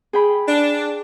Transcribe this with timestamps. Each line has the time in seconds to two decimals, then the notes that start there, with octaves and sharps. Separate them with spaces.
0.13 G#4 G5 B5
0.47 D4